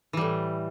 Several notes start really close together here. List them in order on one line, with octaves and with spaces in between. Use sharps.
E3 G3 A2